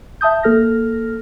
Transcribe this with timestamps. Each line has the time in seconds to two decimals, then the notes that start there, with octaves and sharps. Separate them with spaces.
0.21 E5 A5 D#6 G6
0.43 A#3 A4 F6 A#6